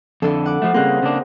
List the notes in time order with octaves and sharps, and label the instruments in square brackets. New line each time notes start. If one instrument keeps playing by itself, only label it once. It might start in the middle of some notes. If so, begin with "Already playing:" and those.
[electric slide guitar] F2 D3 [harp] E4 A4
[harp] F#5 D6
[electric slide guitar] F3 A3
[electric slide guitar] C#3 G3 A#3 [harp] C4 G#4 F#6
[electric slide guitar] C#3 A#3 D4